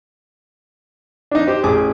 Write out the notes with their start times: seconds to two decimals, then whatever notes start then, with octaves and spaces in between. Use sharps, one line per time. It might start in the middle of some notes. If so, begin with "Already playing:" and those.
1.31 D4 D#4
1.47 G4 C5
1.63 A1 G#4 D6